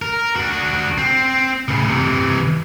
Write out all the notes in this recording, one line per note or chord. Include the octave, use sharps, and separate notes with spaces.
A#4
D4 F#4
C4
A2 C#3
C3 E3